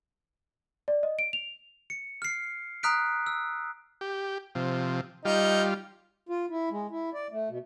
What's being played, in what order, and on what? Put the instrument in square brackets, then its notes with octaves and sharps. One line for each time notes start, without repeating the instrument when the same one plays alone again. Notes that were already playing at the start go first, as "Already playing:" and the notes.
[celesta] D5
D#5
D7
F7
[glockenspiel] C#7
F6 C7
A#5 D#6 F6 F#6 B6 D7
E6
[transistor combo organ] G4
C3 F3
[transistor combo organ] G3 F4 [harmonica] D#4
[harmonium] F4
E4
G#3
E4
D5
A3
B2